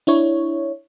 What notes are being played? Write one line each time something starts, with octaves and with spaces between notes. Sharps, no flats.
D4 E4 C#5